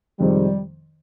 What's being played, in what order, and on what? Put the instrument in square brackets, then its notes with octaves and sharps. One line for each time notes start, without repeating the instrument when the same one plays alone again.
[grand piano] F2 C3 D#3 G#3 C4 [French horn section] G3